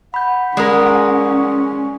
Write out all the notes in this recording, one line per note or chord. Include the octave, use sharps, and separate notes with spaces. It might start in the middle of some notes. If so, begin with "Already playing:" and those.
F#5 B5 G6
G#3 C#4 A#4 D5 D#6